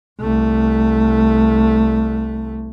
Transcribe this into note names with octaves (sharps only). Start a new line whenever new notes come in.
C2 A3